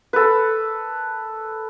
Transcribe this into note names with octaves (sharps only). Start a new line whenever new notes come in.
A4 B4